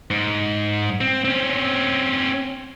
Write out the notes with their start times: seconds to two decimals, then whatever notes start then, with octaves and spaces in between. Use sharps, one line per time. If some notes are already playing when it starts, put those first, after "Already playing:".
0.11 G#2
1.01 C4
1.25 C4 C#4